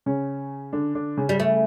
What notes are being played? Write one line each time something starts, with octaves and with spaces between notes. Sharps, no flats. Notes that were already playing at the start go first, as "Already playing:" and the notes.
C#3 C#4
D3 D4
D3 D4
C#3 C#4
G3
A3